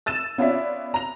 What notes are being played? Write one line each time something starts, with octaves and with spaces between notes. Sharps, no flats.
E6 A6 D#7 E7
B3 C#4 F4 C#5 D5 E5
A#5 F7